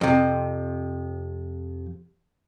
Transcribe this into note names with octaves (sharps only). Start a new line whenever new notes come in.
F2 C3